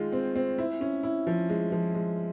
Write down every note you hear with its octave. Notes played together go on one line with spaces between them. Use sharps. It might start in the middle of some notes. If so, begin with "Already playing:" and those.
Already playing: D#3 G#3 F4
C4
C4
E4
C#4
E4
F3
G#3
F3
G#3